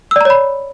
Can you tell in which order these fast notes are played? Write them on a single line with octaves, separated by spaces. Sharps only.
E6 D5 A#5 C#5 B5